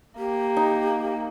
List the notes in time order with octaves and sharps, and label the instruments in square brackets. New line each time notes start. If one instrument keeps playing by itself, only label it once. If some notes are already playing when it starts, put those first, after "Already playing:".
[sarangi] A#3 [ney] G4
[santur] D#4